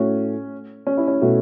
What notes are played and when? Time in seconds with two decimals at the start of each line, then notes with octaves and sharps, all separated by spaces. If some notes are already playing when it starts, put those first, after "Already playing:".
Already playing: A2 A3 C#4 F#4
0.87 C#4
0.98 E4
1.08 C#4
1.22 B2 A3 F#4